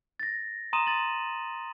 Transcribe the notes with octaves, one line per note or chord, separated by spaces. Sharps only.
A6 A#6
A#5 C6 D#6 D#7 E7
A6 F#7